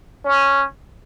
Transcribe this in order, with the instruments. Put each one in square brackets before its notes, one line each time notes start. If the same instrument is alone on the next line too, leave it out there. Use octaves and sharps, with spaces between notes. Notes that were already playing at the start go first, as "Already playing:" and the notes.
[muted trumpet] C#4